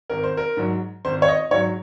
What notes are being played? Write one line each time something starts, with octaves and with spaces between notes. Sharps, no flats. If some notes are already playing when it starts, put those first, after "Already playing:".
G#1 A#4
C5
A#4
G#2 F#3
G#1 C5
C#5
D#5
G#2 F#3 C#5